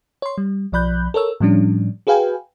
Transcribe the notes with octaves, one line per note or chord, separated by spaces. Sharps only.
C#5 C6
G3
B1 F3 D5 B5 F#6 G6
A4 A#4 C#5 E6
A2 F3 G3 C#4 D4
F#4 G#4 B4 F5 G5 G#5